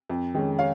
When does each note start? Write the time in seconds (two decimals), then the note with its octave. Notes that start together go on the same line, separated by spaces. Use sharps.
0.10 F2
0.34 D#3 G#3 C#4
0.59 C#5 F5